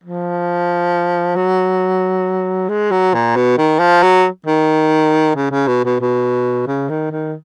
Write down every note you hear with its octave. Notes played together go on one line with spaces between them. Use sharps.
F3
F#3
G#3
F#3
A#2
B2
D#3
F3
F#3
D#3
C#3
C#3
B2
B2
B2
C#3
D#3
D#3